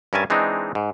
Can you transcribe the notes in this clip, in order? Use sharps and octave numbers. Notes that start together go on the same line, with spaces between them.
G2 C#4 A#4 E5 G#5 A5
E3 G#3 C4 D4 D#4
G#2